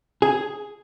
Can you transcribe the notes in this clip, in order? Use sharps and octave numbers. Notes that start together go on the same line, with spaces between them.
G#4